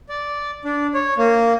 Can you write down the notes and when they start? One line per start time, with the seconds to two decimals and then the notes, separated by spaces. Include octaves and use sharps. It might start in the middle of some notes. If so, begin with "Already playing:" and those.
0.09 D5
0.65 D4
0.94 C#5
1.18 A#3